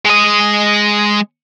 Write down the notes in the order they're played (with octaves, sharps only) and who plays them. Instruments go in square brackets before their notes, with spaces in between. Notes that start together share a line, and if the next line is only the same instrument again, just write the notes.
[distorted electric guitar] G#3 D#5